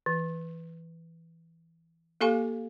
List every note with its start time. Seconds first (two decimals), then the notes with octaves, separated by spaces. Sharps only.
0.06 E3
2.21 A#3 G4 A4 F5 G#5 C#6